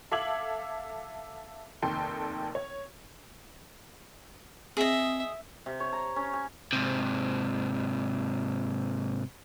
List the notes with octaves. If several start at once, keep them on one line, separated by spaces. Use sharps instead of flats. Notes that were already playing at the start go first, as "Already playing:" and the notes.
A4 E5 F5 D6 G#6 F#7
F1 D#2 A4 G5 C6
C#5
C4 G#4 D#5 E5
C3
C#5
A#5
C#4
G#5
G#2 C3